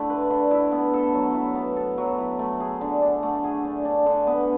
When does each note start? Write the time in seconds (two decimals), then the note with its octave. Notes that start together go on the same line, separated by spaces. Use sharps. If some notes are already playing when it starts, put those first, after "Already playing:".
Already playing: D3 A3 E4
0.10 B4
0.30 D3
0.51 E4
0.72 B3
0.93 A4
1.14 F#3
1.34 E4
1.55 B3
1.76 A4
1.98 F#3
2.19 E4
2.39 A3
2.60 G#4
2.81 D3
3.02 D4
3.23 A3
3.44 G#4
3.65 D3
3.85 D4
4.06 D3
4.27 B3